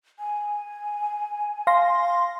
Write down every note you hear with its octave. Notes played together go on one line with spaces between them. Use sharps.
G#5
F5 C6 A#6